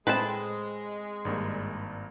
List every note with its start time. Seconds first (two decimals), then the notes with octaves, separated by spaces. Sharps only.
0.07 A2 G#3 C4 B4 A5
1.25 G#1 G2 A#3